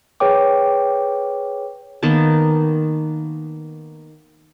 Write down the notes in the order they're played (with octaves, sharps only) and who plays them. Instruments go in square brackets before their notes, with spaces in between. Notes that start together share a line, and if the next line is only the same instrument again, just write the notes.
[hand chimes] G#4 B4 C#5 G5 D6
[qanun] D#3 A#3 B3 A5